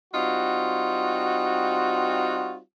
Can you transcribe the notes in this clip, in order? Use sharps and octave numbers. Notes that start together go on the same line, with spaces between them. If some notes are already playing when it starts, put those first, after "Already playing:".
G3 C4 D#4 F4 F#4